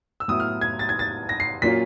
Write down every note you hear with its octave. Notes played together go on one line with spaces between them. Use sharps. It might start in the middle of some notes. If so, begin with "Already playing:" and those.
E6
A2 F#3 B3 E4 D#6
F6
G#6
A6
G#6
A6
A#6
C7
A#2 F#3 A#3 C#4 F4 B6